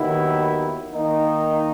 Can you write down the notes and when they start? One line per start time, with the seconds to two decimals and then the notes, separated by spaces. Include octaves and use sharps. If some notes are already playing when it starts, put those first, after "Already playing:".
Already playing: D#2 D#3 F#3 B3 E4
0.92 D#3 A#3 D#4